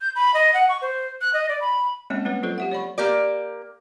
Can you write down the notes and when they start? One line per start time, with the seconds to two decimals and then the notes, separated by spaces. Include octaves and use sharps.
0.01 G6
0.16 B5
0.34 D#5
0.54 F#5
0.69 C#6
0.82 C5
1.21 F#6
1.34 D#5
1.49 D5
1.61 B5
2.10 G#3 A#3 C4 C#4 C#5 E5
2.25 G3 A#3 D#4 B4 C#5
2.43 F#3 F4 A4 C5
2.58 G4 E5 F#5
2.72 C#5 D5 B5 C#6
2.98 A#3 G4 A#4 D5